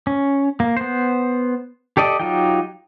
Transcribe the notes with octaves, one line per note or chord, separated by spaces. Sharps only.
C#4
A#3
B3 C5
G4 A4 D5 D#5
F#3 D#4 F4 G4 G5